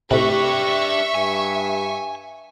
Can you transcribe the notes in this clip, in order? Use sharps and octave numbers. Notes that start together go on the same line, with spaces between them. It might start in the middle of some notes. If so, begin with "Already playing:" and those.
A2 C3 D4 G4 B4 E5 C#6
G2 G#5